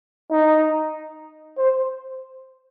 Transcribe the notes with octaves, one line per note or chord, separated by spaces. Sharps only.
D#4
C5